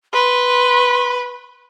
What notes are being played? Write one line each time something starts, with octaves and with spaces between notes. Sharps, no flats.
B4 C6